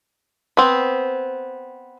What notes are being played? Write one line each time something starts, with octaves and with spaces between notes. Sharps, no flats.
B3 C4